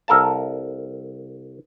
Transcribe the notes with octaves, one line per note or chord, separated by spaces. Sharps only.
C2 A4 A#4 F5 A5